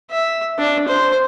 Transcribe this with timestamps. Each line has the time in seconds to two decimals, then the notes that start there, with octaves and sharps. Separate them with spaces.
0.11 E5
0.58 D4
0.88 C5